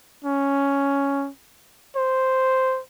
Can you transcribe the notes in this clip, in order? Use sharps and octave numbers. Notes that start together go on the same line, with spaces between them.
C#4
C5